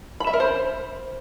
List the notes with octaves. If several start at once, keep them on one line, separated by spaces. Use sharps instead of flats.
B5
E5
A#4
C5